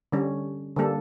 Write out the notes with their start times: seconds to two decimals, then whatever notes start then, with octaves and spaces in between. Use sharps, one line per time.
0.12 D3 G3 C#4
0.76 D3 G3 A#3 D4 A4